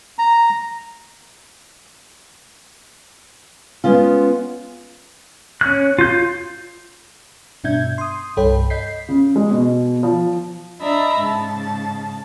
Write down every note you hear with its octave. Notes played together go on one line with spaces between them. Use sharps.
A#5
G#3 B3 C#4 F4
C#4 F#6
F4 G6
G2 B2 D4 E5 G6 G#6
C6 D#6
C2 G2 A4 C#5 G5 B5
D#5 G6 B6 C7
C#3
G#3
B2
F3
D4 D#5 E5 A#5 B5
G#2 C#3 A5